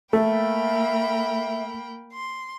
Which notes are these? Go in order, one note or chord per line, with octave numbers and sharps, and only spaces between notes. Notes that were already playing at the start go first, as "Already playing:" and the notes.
A3 A#3 E5 G5 B5
C6